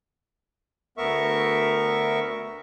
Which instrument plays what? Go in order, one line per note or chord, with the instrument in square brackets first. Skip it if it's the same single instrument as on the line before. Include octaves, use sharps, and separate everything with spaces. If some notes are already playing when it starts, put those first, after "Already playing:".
[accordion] D2 B3 A#4 E5 C#6